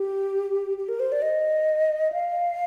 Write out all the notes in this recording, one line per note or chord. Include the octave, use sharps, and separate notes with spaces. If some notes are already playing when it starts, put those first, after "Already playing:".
Already playing: G4
G4
A#4
C5
D5
D#5
F5